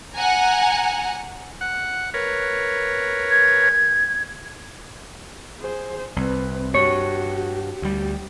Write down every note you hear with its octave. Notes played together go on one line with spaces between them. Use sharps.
F#5 G#5 A#5
F#5
A#4 B4 C#5
G#6
G#4 C5
C2 C4 B4
G2 F#4 G4 C#5
D2 G3 G4